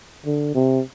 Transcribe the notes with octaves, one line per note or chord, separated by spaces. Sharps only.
D3
C3